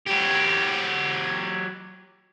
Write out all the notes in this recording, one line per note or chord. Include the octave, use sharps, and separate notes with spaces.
F#3 G4